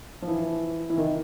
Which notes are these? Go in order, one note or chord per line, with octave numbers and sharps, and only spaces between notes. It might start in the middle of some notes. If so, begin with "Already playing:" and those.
F3
E3
E3
D#3